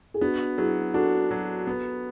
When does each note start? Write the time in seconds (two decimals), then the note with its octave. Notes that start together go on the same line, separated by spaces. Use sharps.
0.14 G#4
0.21 B3 D4 F#4
0.57 F#3 E4 G#4
0.94 D4 F#4 A4
1.31 F#3
1.67 B3